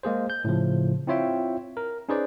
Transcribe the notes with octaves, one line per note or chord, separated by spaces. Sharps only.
G#3 A#3 G#4 C5
G6
A2 C#3 F3
C4 E4 F4 C#5 E5 G5
A#4
C#4 D#4 G#4 B4 C5 D5